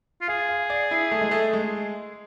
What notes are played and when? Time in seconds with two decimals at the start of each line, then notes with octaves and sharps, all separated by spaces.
0.21 F4
0.28 G#4 F5
0.49 F5
0.70 D5
0.91 E4
1.11 A3
1.21 G#3
1.31 A3
1.53 G#3